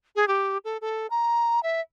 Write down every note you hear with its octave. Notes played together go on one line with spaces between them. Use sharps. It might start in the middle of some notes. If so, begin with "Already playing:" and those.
G#4
G4
A4
A4
A#5
E5